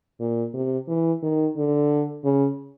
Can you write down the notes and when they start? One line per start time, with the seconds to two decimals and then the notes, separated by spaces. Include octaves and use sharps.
0.20 A#2
0.54 C3
0.88 E3
1.23 D#3
1.57 D3
2.24 C#3